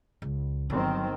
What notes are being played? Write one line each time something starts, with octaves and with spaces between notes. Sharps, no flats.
C#2
G1 D#3 F#3 C4